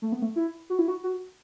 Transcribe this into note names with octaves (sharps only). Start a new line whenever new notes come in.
A3
B3
A3
E4
F#4
E4
F#4
F#4